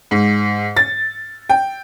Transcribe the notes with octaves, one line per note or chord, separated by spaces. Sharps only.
G#2
A6
G5